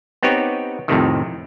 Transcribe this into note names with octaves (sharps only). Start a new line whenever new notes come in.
B3 C4 D#4 G4 C#5
F2 A2 C3 D#3